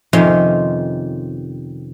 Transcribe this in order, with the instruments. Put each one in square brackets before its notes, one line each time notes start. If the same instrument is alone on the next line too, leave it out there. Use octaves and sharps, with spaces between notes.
[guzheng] F2 C3 D#3 C#4 F5 C6